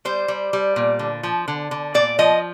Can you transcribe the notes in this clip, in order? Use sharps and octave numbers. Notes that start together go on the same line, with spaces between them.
G3 C5
G3
G3
A#2
D3
F3
D3
D3
A#2 D5
F3 D#5